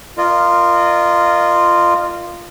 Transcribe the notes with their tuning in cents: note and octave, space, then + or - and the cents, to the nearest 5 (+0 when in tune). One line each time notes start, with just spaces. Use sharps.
F4 -10 A#4 +0 D#5 -35